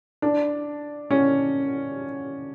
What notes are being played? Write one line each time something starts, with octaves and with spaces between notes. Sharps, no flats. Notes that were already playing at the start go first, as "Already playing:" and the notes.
D4
C#4